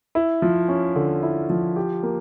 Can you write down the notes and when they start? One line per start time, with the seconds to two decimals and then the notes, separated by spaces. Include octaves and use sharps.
0.15 E4
0.42 F3
0.69 C#4
0.96 D3
1.23 E4
1.50 F3
1.76 G4
2.03 A#3